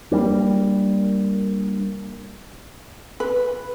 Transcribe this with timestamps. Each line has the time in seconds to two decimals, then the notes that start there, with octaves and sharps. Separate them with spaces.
0.12 G3 G#3 A#3 D4
3.20 B4